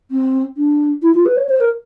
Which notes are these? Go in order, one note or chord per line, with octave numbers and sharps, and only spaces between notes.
C4
D4
E4
F4
B4
C#5
C5
A#4